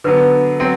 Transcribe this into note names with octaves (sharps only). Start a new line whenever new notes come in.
D3 F#3 B3 B4
F#3 C4